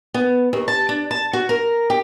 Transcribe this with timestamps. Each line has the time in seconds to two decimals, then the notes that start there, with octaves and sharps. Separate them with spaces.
0.14 B3
0.53 D#2
0.68 A5
0.89 D4
1.11 A5
1.33 F#4
1.49 A#4
1.90 G4